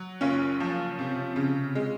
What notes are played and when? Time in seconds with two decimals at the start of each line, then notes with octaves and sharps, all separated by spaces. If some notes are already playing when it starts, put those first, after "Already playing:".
Already playing: F#3
0.21 F#1 C#4 F4
0.60 F3
0.99 C3
1.36 C#3
1.75 G#3